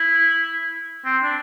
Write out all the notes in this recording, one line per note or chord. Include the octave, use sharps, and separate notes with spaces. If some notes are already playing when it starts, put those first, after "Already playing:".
Already playing: E4
C4
D4